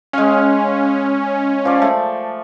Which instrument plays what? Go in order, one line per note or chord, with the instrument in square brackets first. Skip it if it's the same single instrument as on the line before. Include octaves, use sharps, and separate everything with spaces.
[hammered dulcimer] G#3 F5 [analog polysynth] C#4
[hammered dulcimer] F3 D5
A3